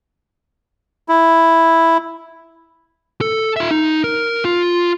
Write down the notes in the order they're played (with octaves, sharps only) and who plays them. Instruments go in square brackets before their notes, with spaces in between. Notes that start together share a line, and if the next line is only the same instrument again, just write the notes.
[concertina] E4
[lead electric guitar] A4
F4 E5
D#4
A#4
F4